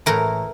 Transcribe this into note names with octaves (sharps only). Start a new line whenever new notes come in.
A2 E3 A#4